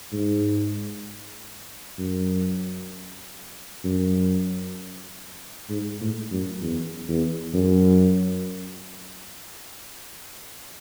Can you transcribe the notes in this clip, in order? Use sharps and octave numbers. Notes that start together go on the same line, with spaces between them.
G#2
F#2
F#2
G#2
A2
F#2
E2
E2
F#2